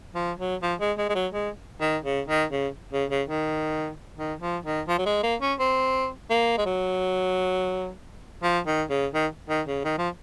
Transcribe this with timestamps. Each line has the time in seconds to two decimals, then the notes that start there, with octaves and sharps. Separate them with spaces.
0.15 F3
0.39 F#3
0.62 F3
0.80 G#3
0.98 G#3
1.09 G#3
1.15 F#3
1.33 G#3
1.81 D#3
2.04 C#3
2.28 D#3
2.52 C#3
2.93 C#3
3.10 C#3
3.28 D#3
4.17 D#3
4.41 F3
4.64 D#3
4.88 F3
4.98 F#3
5.06 G#3
5.23 A#3
5.41 C#4
5.59 C4
6.30 A#3
6.58 G#3
6.66 F#3
8.43 F3
8.67 D#3
8.90 C#3
9.14 D#3
9.49 D#3
9.68 C#3
9.85 D#3
9.99 F3